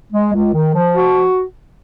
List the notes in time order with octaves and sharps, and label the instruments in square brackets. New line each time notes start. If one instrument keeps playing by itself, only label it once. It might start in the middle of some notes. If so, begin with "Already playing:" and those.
[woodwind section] G#3
C#2
D#3
F3
F#4